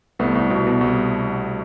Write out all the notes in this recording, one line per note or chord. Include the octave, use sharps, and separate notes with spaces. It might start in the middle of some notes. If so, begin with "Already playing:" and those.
C2 A3 B3
C2
B2
B2
C2